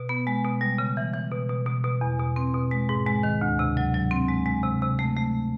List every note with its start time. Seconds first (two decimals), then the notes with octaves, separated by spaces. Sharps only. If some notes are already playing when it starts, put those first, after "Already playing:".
Already playing: B2
0.09 B3
0.27 G#3
0.44 B2
0.61 G3
0.78 C#3
0.97 E3
1.14 E3
1.31 B2
1.49 B2
1.66 B2
1.84 B2
2.01 E2
2.19 B2
2.36 C4
2.54 B2
2.71 G#3
2.89 G#2
3.06 G#3
3.23 D#3
3.41 D2
3.59 C3
3.77 F#3
3.94 F#3
4.11 C4
4.29 G#3
4.46 G#3
4.63 C3
4.82 C3
4.99 A3
5.16 A3